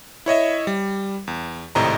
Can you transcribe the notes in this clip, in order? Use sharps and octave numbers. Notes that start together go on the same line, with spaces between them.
E4 C#5 D#5 E5
G3
E2
G#1 A2 C3 D#5 A#5